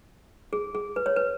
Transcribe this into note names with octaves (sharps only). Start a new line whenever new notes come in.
G#4
G#4
B4
C#5
B4